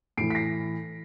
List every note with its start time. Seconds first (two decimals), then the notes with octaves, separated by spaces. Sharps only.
0.17 A2 C7 D7
0.21 E3
0.30 B6
0.35 A#6 C7